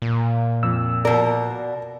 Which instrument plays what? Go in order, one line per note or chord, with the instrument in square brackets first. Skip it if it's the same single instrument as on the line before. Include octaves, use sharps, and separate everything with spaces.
[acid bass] A#2
[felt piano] F2 [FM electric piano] E6
[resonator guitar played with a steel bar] B2 A#4 [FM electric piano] D5 [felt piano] A5